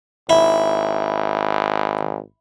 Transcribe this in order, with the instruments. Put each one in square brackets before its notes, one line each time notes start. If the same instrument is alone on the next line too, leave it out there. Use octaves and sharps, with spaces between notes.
[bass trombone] G#1 [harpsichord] E4